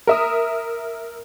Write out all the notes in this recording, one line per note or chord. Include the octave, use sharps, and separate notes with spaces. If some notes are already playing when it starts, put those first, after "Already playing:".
A#4 E5 D#6